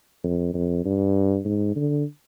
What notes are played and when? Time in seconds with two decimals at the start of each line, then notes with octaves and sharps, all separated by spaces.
0.24 F2
0.54 F2
0.85 G2
1.45 G#2
1.76 D3